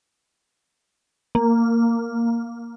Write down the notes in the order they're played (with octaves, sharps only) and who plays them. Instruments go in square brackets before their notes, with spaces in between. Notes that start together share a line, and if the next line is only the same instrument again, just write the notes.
[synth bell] A#3